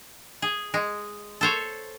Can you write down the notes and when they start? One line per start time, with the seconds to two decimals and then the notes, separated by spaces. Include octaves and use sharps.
0.42 G#4
0.74 G#3
1.41 A4 C5 C#5